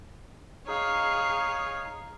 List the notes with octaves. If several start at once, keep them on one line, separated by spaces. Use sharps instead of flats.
D#4 G#4 C#5 F5